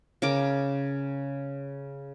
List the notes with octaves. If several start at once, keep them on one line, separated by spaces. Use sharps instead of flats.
C#3 A#4 D6